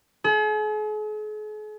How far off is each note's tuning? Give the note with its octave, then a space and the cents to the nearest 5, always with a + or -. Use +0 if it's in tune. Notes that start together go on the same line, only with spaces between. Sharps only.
G#4 +45